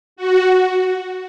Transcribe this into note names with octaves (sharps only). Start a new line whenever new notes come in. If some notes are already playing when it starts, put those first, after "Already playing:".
F#4